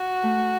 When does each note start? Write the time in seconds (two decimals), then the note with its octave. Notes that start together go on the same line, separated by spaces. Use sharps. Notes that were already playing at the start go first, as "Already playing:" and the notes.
Already playing: F#4
0.23 A3